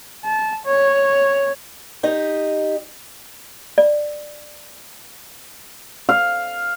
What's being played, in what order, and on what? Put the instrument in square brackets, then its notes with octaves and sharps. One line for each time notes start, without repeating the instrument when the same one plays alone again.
[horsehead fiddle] A5
C#5
[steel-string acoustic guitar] D#4 G4 D#5
[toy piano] D5
[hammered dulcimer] F5